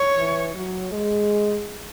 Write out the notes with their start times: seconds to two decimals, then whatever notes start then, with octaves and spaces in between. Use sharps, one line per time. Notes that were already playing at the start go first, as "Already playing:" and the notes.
Already playing: C#5
0.16 E3
0.54 F#3
0.92 G#3